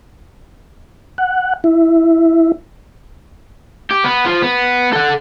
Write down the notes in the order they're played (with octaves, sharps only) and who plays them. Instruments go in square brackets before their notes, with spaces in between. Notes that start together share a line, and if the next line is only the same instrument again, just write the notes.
[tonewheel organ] F#5
E4
[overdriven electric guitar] G4
B3
F3
B3
A4 F#5